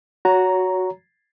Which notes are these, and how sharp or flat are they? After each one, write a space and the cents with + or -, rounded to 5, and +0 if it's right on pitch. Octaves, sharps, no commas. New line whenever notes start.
F#4 -5 C#5 +20 A#5 +0